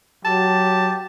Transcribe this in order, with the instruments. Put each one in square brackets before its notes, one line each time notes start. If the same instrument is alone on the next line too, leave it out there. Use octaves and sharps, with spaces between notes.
[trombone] F#3 [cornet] G4 [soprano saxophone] A5